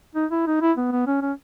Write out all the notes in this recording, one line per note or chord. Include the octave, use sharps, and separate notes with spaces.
D#4
E4
D#4
E4
B3
B3
C#4
C#4